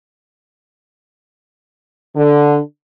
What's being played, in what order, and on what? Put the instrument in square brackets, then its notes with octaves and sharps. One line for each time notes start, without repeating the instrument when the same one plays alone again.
[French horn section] D3